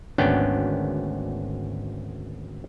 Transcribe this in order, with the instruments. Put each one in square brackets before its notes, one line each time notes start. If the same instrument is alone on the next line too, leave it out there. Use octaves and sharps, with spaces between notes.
[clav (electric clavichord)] G#1 D2 B3 C#4 D4 G5